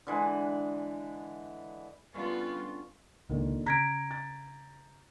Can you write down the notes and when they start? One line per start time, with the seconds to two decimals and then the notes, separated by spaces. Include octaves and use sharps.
0.07 D3 E3 G#3
2.14 D3 G3 B3 C#4 F4
3.30 C#2 A#2 D3 D#3
3.66 C#3 A#5 G6 G#6 A#6 B6 D7
4.11 A6